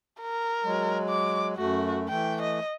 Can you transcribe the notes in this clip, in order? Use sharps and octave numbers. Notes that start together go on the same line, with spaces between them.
A#4
F#3 G#3
D6
F#2 A3 F#4
E3 A3 G5
D#5